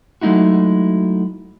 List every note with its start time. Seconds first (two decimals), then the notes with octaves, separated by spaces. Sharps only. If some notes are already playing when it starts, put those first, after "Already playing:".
0.21 F#3 G#3 A3 D#4 E4 F#4